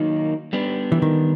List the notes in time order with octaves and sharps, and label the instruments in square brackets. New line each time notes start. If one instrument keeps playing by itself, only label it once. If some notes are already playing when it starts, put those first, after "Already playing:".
Already playing: [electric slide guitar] D#3 F#3 A#3 D#4
G3 B3 D4
[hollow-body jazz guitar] E3
D#3